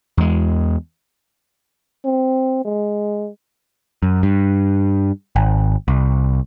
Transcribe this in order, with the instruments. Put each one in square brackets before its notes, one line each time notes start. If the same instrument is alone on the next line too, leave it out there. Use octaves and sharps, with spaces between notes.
[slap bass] E2 G#3
[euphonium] C4
G#3
[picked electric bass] F#2
G2
G#1
C2